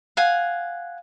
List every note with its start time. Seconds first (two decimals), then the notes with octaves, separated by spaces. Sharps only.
0.17 F5 F#5 G#5